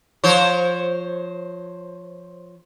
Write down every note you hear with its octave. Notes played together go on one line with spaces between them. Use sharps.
F3 C5 C#5